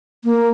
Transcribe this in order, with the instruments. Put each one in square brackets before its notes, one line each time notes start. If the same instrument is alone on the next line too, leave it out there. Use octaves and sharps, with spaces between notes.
[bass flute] A#3